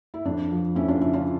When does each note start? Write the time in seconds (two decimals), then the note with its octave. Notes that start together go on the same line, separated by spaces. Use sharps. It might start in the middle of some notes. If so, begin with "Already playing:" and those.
0.14 E4
0.25 F2 D4
0.51 F3
0.75 F2 C#4 E4
0.88 D4 F4
1.01 C#3 C#4 E4
1.13 D4 F4